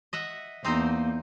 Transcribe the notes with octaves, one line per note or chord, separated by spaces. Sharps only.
D#5 E5 F#5
E2 A#3 C4 D#4 C5